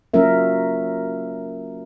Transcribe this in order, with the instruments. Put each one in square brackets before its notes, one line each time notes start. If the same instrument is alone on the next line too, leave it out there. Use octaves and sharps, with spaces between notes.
[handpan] F#3 A#3 C#4 F4 A#4 E5